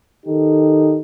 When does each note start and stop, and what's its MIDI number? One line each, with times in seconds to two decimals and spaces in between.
0.26 1.01 51
0.26 1.01 63
0.26 1.01 67
0.26 1.01 69